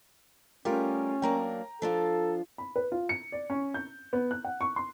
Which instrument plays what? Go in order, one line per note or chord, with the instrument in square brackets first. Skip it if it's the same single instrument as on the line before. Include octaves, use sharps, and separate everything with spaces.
[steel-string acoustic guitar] G3 A#4 [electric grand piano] A3 F4 G4 [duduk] C#4
[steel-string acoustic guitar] F#3 A#3 D4 [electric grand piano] G5 A#5
[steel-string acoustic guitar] F3 D4 F4 [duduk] A4
[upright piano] B5
B4
F4
C#7
D5
C#4
G6
B3
F#6
F#5
C#6
C6